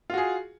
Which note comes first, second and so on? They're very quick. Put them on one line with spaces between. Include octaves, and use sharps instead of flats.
F4 F#4 G#4